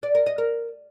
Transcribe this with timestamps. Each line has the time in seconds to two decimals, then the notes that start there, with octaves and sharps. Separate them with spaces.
0.03 D5
0.15 A#4
0.26 D#5
0.38 A#4